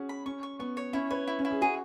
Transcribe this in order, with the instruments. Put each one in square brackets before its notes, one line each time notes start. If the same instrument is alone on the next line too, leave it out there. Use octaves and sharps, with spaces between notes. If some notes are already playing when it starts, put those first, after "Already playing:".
Already playing: [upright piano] C#4 F#4 G#4
[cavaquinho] B5
[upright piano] C#4 [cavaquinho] C#6
[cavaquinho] C#6
[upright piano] B3 [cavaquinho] C#6
[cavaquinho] C#5
[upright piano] C#4 [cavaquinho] E4
[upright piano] B4 [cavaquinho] C#5
[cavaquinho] E4
[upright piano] C#4
[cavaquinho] E4
[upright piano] G#4
[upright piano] F#4 [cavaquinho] G#4